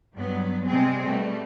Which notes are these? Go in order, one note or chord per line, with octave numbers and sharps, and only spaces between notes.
G2 F#3 B3
C3 G3 G#3 C4 G#4
B2 G3 A3